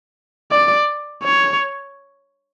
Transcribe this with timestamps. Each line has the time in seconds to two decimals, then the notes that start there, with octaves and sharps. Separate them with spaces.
0.51 D5
1.24 C#5